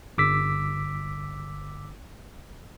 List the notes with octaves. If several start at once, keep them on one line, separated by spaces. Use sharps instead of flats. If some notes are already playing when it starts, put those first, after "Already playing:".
G1 D6 E6 B6